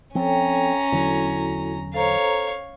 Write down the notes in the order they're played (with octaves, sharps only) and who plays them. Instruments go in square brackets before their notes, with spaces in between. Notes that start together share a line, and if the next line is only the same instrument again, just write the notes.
[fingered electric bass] F3 C4 [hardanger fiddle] C#4 A#5 [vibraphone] A4 C#5 G5
[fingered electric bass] E2 D3 F#3 [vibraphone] E4 F#4 A4
[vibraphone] A4 C5 A#5 [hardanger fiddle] C#5 F5